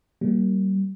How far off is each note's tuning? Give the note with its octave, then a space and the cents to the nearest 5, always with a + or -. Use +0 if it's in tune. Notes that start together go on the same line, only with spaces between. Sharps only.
G3 -35 A#3 +0